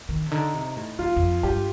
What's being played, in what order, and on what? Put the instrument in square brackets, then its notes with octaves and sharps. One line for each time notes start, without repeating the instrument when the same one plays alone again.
[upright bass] D#3
C3
[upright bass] D3 [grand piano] D#4
[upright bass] C3
A2
[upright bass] F2 [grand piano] F4
[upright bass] F2
[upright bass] G2 [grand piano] G4